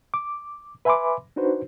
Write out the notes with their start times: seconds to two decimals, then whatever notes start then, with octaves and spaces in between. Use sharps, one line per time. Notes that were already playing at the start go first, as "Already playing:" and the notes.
0.14 D6
0.85 B4 E5 G#5 B5 C6 D6
1.36 D4 D#4 F#4 B4 C5